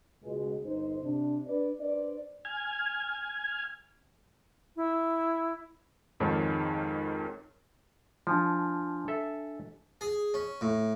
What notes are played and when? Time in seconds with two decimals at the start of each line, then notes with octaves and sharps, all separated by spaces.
0.23 C#2 B2 G#3
0.64 G1 D#4 C5
1.03 C3 D4
1.47 D4 B4 D5
1.80 D4 B4 C5 D5
2.45 G#5 F6 G#6
4.76 E4
6.20 F2 G#2 D#3 C#5 A5
8.27 F3 D4 G#5 A5
9.08 A4 E5
10.01 G#4
10.34 C#4
10.61 A2